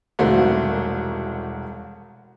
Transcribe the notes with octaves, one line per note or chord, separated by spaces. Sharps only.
E1 C2 D#3 A3 F#4 C5